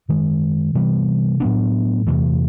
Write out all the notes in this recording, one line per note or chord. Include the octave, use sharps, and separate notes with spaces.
F#2 D#3 G#3
C3 E3 G3 B3
A2 F#3 B3 D4
E2 C3 E3 A3